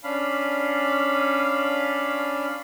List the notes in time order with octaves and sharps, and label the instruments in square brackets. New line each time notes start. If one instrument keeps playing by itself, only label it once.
[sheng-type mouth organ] C#4 D4 F5 B5